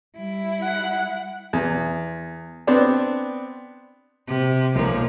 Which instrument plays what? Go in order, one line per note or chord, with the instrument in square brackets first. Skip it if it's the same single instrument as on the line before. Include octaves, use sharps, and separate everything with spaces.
[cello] G3 E4
[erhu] F#5
[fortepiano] E2
B3 C4 D4
[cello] C3
[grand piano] B1 A#3 [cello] F3